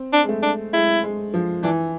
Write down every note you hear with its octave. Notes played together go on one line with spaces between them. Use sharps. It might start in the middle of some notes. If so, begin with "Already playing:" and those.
Already playing: C4
D4
G#3
A3
D4
G#3 E4
G#3
F3
E3 D4